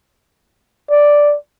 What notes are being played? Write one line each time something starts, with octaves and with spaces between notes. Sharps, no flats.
D5